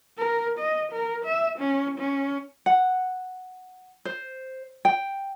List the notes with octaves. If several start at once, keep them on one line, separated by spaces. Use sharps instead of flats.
A#4
D#5
A#4
E5
C#4
C#4
F#5
C5
G5